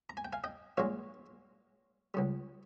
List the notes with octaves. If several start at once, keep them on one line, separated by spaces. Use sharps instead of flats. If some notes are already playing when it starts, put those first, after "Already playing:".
A#5
G#5
G5
F5 G#5
D#5 G5
A#1 A#2 G#3 C#5 F5
C#2 C#3 G3